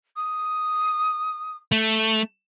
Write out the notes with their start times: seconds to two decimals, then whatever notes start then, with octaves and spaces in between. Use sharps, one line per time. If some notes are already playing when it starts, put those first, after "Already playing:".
0.16 D#6
1.72 A3